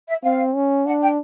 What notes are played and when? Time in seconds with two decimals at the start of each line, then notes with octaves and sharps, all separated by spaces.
0.09 E5
0.23 C4 F5
0.55 C#4
0.86 D4 F#5
1.02 G5